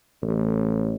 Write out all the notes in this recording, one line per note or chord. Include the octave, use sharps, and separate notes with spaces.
A1